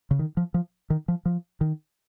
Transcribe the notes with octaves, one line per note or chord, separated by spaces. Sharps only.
C#3
D#3
F3
F3
D#3
F3
F3
D#3